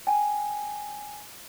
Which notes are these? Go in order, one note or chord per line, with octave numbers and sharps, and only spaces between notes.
G5 G#5